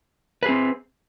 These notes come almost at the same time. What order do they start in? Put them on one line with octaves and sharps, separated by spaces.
B4 G#4 C4